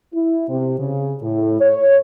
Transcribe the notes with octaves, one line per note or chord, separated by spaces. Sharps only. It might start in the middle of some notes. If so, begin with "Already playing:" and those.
E4
C3
C#3
A2
C#5